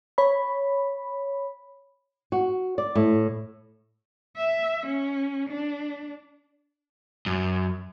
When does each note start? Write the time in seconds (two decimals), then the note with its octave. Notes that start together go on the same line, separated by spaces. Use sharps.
0.18 C#5 B5
2.32 F#4
2.78 D5
2.95 A2
4.36 E5
4.86 C#4
5.49 D4
7.26 F#2